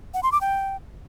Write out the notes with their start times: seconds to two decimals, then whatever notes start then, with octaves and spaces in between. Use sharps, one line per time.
0.14 F#5
0.23 C6
0.32 D6
0.41 G5